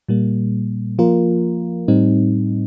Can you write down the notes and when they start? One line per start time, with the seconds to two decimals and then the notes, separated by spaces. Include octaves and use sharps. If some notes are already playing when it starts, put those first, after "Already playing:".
0.09 A#2 G3 A#3
0.99 F3 A#3 F4 A#4
1.88 A2 G3 C4 D#4